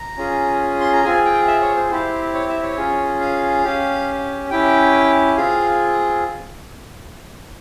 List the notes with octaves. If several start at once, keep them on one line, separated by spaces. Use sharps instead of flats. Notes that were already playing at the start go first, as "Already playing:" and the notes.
Already playing: A#5
C#4 F4 G#4
C6
A#5
C4 F4 G#4 G#5
G5
E5
C#5
C5
C4 E4 G4 C5
C#5
E5
C#5
C#4 F4 G#4
F5
C#4 G4
C#4 E4 G4 G5
C4 F4 G#4 F5